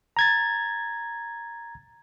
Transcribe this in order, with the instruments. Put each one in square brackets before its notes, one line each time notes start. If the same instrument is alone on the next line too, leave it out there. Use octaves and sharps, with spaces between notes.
[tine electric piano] A#5 G#6 A6